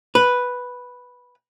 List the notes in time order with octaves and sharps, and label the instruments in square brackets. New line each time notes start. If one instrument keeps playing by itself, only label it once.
[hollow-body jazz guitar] B4